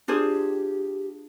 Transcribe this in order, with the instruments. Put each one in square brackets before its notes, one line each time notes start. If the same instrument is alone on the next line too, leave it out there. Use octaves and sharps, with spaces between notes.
[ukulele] D4 F4 G#4 C5 [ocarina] G4